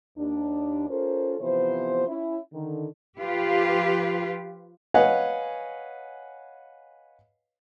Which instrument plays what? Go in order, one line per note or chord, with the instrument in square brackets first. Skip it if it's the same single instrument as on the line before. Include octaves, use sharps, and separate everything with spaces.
[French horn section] D#2 D4
C#4 F4 A4 A#4 C5
C3 E3 F3 B3 C5
C#4 E4
D3 D#3
[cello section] F3 F4 G4 B4
[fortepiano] B4 C#5 D#5 F5 F#5 G#5